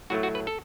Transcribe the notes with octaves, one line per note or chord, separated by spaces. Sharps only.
A2 F#3 A3 F#4
F#4
B4
A4